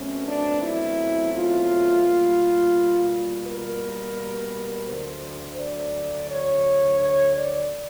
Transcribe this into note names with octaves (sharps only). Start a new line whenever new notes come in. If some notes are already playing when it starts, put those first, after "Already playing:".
Already playing: E2 B2 F#3 A3 C4 C#4
D4
E4
F4
B2 G3 A#3
A#4
D2 D3 F#3 C5
D5
C#5
C#5
D5